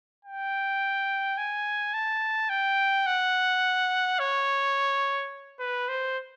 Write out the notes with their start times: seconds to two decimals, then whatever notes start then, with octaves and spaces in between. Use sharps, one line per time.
0.25 G5
1.38 G#5
1.94 A5
2.49 G5
3.06 F#5
4.19 C#5
5.60 B4
5.88 C5